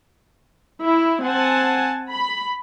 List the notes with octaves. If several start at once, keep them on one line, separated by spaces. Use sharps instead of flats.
E4
C4 F#5 G#5 A5
B5